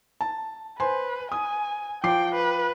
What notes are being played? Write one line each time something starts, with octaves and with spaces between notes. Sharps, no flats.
A5
B4 C5 G#5 C6
G#5 D#6
F3 G5 D6 C7
B4